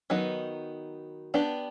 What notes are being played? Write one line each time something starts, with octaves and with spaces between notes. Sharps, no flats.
D#3 F#3 B3 D#4
B3 D4 G4